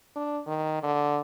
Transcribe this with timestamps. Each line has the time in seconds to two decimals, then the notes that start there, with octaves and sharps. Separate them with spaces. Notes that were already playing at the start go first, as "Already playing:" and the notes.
0.16 D4
0.47 D#3
0.83 D3